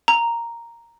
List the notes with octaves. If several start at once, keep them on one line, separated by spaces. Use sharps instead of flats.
A#5